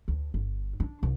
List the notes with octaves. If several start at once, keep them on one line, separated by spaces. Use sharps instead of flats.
D2
G1
D4
C2